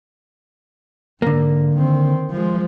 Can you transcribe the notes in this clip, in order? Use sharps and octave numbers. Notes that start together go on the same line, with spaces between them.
G#2 D3 A#3
D#3 C4
F3 G#3